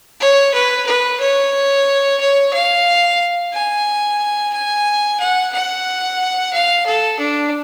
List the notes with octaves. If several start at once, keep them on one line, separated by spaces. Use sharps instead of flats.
C#5
B4
B4
C#5
C#5
F5
G#5
G#5
F#5
F#5
F5
A4
D4